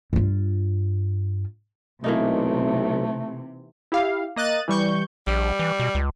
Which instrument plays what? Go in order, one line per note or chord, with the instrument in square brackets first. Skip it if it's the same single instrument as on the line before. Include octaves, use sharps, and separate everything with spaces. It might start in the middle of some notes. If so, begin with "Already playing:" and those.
[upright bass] G2 F4
[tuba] B1 [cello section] C3 [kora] E3 A#3 D#4 [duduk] A3
[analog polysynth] E4 G4 F5
A#3 D#5 F#6 A6 D#7
E3 G3 C#6 G6
[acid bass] A#1 [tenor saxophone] G3
[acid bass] E3
B2
C#2